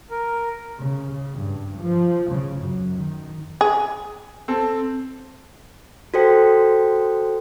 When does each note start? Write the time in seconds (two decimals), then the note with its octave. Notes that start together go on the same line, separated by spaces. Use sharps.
0.10 A#4
0.79 C#3
1.36 G2
1.81 F3
2.31 C#3
2.61 F#2
2.95 D#3
3.61 G#4
4.48 C4 A4
6.14 F#4 A4 C5 G5